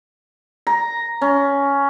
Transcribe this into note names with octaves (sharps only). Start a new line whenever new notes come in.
A#5
C#4